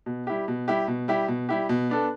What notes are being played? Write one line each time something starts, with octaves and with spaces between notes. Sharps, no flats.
B2
G3 E4 G4
B2
G3 E4 G4
B2
G3 E4 G4
B2
G3 E4 G4
B2
B3 D4 A4